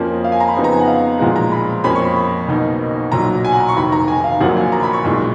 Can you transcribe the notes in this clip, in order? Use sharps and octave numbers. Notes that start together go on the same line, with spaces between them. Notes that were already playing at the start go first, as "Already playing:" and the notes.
Already playing: F2 F3 A#3 C#4
F5
G#5
A#5
B5
F2 C#3 F3 B3 D#4
A#5
G#5
F#5
F5
B1 A#2 F3 G#3 F#5
A#5
B5
F2 F3 A#3 C#4 B5
C#6
B5
B5
B1 B2 A#3 D#4
B1 A#2 F#3 A#5
G#5
F#5
A#5
C#6
F1 D#2 D#3 B5
A#5
G#5
F5
A#1 A#2 F#3 A#3 F#5
G#5
A#5
B5
C#6
B1 A#2 G#3